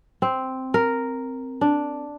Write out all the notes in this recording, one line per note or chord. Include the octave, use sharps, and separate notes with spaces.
C4
A#4
D4